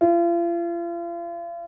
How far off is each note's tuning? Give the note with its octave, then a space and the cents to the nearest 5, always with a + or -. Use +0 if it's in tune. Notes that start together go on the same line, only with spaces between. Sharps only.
F4 -40